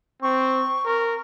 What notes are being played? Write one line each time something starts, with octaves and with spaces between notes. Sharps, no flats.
C4 C#6
A#4